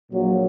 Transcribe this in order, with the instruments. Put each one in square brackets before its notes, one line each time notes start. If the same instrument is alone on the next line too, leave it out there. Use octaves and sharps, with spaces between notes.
[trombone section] A#1 A#2 F#3